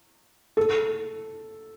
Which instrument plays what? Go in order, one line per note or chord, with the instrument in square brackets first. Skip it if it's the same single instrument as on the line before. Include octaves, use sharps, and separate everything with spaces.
[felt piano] A4